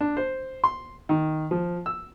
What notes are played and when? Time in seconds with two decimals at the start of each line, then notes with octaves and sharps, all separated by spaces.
0.01 D4
0.17 C5
0.64 C6
1.09 D#3
1.51 F3
1.86 E6